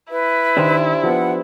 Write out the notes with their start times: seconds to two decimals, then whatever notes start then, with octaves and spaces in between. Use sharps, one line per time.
0.11 E4 B4
0.57 D#3 D4 G4 C5
1.03 F3 B3 F#5